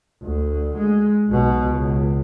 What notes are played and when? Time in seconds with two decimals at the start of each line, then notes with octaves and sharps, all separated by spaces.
0.23 D2
0.77 G#3
1.28 B1 B2
1.65 C#2